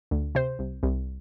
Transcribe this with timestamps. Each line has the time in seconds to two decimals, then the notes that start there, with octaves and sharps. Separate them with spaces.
0.11 D2
0.35 C3 C5
0.59 C2
0.83 C2